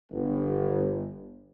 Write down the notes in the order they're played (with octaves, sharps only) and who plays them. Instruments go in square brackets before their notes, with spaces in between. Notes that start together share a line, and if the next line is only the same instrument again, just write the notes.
[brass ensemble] G1